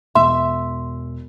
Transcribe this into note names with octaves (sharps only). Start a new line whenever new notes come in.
E1 E5 C6